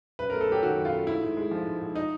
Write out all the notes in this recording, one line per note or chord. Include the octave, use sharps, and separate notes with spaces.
F#2 B4
A3 A#4
A4
F#3 G4
D#3 F#4
F#2
F4
A3
G#2 E4
G#2
G#3
F3
G#2
G#2
D#4